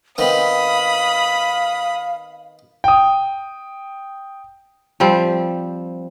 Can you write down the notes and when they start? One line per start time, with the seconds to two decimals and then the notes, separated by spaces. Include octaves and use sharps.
0.18 D#3 B3 C4 F5 B5 D#6
2.84 G5 D#6
5.00 F3 G3 C4